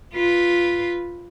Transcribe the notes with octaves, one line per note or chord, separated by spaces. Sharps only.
F4 B4